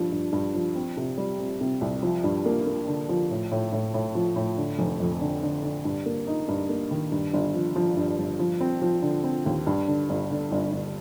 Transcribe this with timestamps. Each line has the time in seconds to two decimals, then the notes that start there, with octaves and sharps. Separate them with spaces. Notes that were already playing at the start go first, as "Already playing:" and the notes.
Already playing: G2 F3
0.12 G2
0.33 G2
0.55 F3
0.75 C4
0.97 C3
1.18 G3
1.39 C4
1.61 C3
1.81 C2
2.03 F3
2.24 G2
2.45 A#3
2.67 A#3
2.87 D3
3.09 F3
3.30 A2
3.51 A2
3.72 A2
3.94 A2
4.15 F3
4.36 A2
4.57 D3
4.79 F1
5.00 F2
5.21 D3
5.43 D3
5.64 D3
5.85 G2
6.06 A#3
6.27 D#4
6.48 G2
6.69 A#3
6.91 D#3
7.12 G2
7.33 G1
7.54 F3
7.76 F3
7.97 G2
8.18 G1
8.39 F3
8.61 C4
8.82 F3
9.02 D3
9.24 C4
9.46 D#2
9.67 G2
9.88 D3
10.09 G1
10.31 D3
10.52 G1
10.72 G1